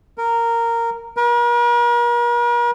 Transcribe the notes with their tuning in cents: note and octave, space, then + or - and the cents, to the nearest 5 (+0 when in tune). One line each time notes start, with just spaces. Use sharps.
A#4 -10
A#4 +45